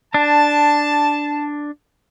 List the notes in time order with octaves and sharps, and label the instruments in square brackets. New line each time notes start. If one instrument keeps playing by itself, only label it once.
[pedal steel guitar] D4 [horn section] A5